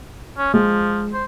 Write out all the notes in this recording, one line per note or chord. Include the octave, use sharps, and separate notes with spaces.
C#4
F3 G#3
C5